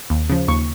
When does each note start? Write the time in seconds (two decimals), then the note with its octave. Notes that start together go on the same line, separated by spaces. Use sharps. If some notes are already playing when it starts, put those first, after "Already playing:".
0.10 D#2
0.29 C#3 F3
0.48 D#2 C#6